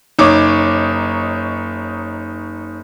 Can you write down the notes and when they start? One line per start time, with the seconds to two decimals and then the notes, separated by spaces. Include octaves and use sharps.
0.19 F#1 D#4 C#5 D6